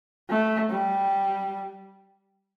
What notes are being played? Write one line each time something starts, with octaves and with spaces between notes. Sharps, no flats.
A3
G3